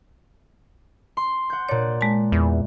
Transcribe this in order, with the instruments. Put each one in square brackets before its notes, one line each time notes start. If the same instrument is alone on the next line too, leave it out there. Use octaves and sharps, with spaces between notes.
[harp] C6
F#5 G6
[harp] A#2 D5 [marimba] C#5
[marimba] G#3 A5
[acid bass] E2